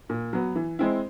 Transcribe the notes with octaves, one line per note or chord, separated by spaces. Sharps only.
A#2
F#3 B3
E3
G#3 C4 E4